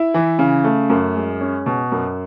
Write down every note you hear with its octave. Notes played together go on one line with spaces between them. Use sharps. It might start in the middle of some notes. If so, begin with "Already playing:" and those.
Already playing: E4
E3
C#3
A3
F#2
G#3
C#4
B2
F#2